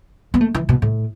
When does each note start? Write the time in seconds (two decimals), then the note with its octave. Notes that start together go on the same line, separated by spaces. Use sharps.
0.34 B3
0.41 A3
0.54 E3
0.69 B2
0.82 A2